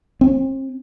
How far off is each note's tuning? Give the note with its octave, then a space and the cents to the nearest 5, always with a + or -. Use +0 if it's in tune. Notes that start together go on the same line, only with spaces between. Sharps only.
C4 +35